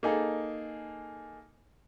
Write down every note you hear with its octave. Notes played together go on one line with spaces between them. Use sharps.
A#3 D#4 G#4 A4